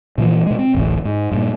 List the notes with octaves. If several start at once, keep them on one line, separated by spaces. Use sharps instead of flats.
A#2 E3 F3
B2 G#3
C4
D1 A1 A2
G#2
G2 A#2